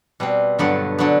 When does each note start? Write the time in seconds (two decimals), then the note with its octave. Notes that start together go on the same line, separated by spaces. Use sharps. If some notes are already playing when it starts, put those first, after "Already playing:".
0.20 B2 G3 C4
0.59 G2 D3 F#3 B3
0.98 D3 F#3 B3